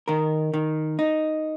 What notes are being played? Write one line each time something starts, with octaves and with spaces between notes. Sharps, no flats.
D#3 A#4
D#3
D#4